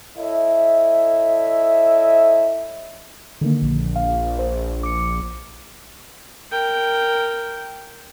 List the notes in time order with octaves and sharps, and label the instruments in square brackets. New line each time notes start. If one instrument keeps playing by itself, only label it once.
[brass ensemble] E4 A4 C#5 D#5 E5
[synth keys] D3 D#3 A#3
[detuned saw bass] A#1
[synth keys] F5
C5
D6 C#7
[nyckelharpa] A#4 G5